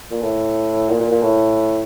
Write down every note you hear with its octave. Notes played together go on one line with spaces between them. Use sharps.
A#2
A2
A#2
A#2
A#2
A2